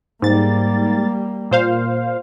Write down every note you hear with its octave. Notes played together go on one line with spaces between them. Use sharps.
G#2 G3 A#3 A6
A#2 C5 F5